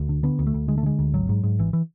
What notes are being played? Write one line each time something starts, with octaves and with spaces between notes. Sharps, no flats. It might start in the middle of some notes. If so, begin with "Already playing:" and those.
Already playing: D2
D3
D3 B3
D2
A3
D2
D3 G#3
A3
D3 G#3
D2
G#1 F#3
G#2
G#2
G#1 E3
E3